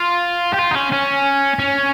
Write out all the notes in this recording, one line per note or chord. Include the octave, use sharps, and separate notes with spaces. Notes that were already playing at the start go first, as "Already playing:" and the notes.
Already playing: F4
G4
F4
D#4
C#4
C#4
C#4